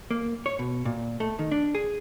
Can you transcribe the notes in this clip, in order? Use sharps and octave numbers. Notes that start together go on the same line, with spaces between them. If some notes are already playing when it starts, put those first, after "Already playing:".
A#3
C#5
B2
A#2
A3
D#3
D4
G#4